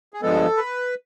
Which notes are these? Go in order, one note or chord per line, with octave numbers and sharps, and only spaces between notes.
G#4
G2 D3 F3 G#3 B3 A4
B4